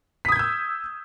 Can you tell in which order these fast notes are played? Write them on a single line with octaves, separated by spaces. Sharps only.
B6 D#6 G#6 G6 E6